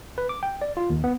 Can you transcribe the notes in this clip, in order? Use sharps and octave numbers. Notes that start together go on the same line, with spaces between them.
B4
D6
G5
D5
F4
D#2
B3